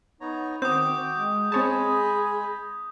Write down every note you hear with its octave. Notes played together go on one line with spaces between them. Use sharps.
B3 D#4 C#5 A#5
D#3 C4 F#4 G5 D6 D#6 G6
G#3
G#3 C4 G#4 C#5 D#5 A5 B5